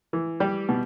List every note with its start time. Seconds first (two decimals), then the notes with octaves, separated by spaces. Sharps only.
0.13 E3
0.40 G3 G4
0.69 B2